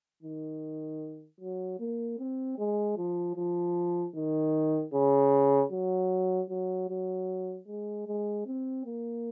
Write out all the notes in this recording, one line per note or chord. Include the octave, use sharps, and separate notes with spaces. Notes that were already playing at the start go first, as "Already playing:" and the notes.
D#3
F#3
A#3
C4
G#3
F3
F3
D#3
C#3
F#3
F#3
F#3
G#3
G#3
C4
A#3